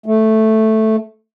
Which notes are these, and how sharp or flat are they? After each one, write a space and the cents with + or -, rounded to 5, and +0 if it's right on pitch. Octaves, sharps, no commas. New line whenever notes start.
A3 -5